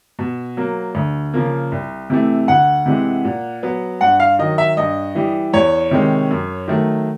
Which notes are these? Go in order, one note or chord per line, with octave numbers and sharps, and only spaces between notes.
B2
F#3 A#3
D2
C#3 F3 A#3
C2
C3 E3 A3
D2 F#5
C3 E3 G#3
A#2
F#3 B3
G2 F#5
F5
D#3 F#3 D#5
E5
G2 D#5
E3 G3
E2 C#5
C3 D#3 G#3
F#2
D#3 F#3 A3